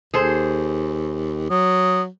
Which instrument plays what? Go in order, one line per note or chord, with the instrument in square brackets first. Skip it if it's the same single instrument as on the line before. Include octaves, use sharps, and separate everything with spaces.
[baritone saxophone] D#2 [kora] G#4 A4 C5
[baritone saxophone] F#3 [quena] D#6